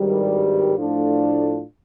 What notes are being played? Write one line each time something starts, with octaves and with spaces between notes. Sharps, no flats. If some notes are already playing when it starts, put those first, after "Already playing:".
Already playing: G#1 G2 D#3 G3
A2 F3 A3 D4 F4